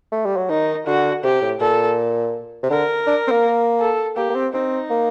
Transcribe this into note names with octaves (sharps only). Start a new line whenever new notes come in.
A3
G3
F#3
D#3 D#4
D3 F#4
C3 G4
A2
A#2 A4
C3
D3 A#4
D4
C4
A#3
A4
A#3 G4
A#3
C4
C4 D#4
A#3